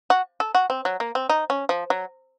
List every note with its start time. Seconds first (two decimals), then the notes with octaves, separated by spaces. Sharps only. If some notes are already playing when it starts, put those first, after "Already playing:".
0.10 F#4
0.40 A4
0.55 F#4
0.70 C4
0.85 F#3
1.00 A#3
1.15 C4
1.30 D#4
1.50 C#4
1.69 F3
1.90 F#3